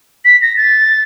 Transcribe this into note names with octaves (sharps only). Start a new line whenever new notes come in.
B6
A#6
A6